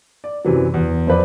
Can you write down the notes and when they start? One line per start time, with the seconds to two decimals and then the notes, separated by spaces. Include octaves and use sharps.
0.24 D5
0.45 F#2 C3 E3 F#3
0.74 E2
1.07 F2 C4 B4 D5